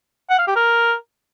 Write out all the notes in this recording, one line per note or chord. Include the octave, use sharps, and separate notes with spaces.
F#5
F5
G4
A#4